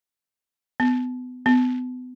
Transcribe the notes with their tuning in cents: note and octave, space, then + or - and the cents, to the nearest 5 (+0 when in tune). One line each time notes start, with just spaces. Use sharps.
B3 +30
B3 +35